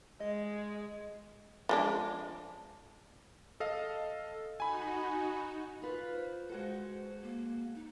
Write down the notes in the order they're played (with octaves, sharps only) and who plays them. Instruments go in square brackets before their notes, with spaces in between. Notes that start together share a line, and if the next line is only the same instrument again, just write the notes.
[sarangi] G#3 [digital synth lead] D#5
[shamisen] F3 G#3 D4
[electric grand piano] A4 D#5 F5
[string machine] D#4 F#4 [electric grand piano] G#5 B5
[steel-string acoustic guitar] F4 B4
[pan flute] C5
[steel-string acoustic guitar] G#3 F#4 A4
[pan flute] A#3
D#4